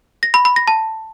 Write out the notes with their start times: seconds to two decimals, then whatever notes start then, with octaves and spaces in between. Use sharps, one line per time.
0.23 A#6
0.34 B5
0.45 B5
0.56 A#6
0.68 A5